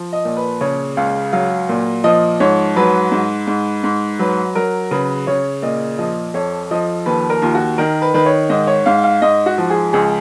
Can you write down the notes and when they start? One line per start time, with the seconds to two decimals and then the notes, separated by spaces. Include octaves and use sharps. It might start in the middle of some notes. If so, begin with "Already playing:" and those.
Already playing: F3
0.13 D#5
0.25 A#2
0.37 B4
0.61 C#3 C#5
0.97 C#2 F5
1.33 F#3 F5
1.69 A#2
2.04 F3 D#5
2.40 G#2 C#5
2.76 F#3 B4
3.12 G#2
3.47 G#2
3.84 G#2
4.19 F#3 B4
4.55 F#3 A#4
4.91 C#3 B4
5.27 C#3 C#5
5.63 A#2 D#5
5.98 F3 D#5
6.34 F2 C#5
6.71 F3 D#5
7.06 D#2 B4
7.30 A#4
7.42 D#2 F4
7.55 F#4
7.78 D#3 A#4
8.02 B4
8.14 D#3 B4
8.26 C#5
8.50 G#2 D#5
8.67 C#5
8.86 G#2 F5
9.04 F5
9.22 G#2 D#5
9.46 F#4
9.58 F3
9.70 G#4
9.93 C#2 G#4